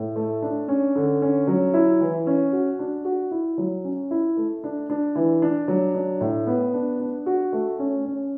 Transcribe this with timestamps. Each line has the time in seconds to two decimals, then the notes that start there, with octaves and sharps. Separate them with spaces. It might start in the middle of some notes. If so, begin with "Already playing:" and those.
Already playing: A2
0.16 A3
0.42 D4
0.68 C#4
0.96 D3
1.22 C#4
1.47 F#3
1.74 E4
2.01 E3
2.27 C#4
2.53 F#4
2.79 D4
3.05 F#4
3.31 E4
3.58 F#3
3.84 C#4
4.11 E4
4.37 A3
4.64 D4
4.90 D4
5.15 E3
5.42 D4
5.68 F#3
5.95 D4
6.21 A2
6.47 B3
6.74 D4
7.00 D4
7.26 F#4
7.53 A3
7.79 C#4
8.05 C#4